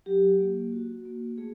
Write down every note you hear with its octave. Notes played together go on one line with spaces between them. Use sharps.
F#3 G4
A#3
F#4
A#3
A3 G#4